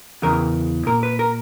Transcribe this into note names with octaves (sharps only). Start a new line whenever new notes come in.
E2 C#3 E3 A#4
A#2 A#4
B4
A#4